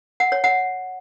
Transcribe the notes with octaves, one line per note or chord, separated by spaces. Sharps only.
F#5
C#5
F#5